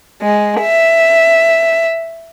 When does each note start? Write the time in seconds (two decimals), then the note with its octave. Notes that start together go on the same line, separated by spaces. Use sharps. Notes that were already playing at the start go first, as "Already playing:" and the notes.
0.23 G#3
0.61 E5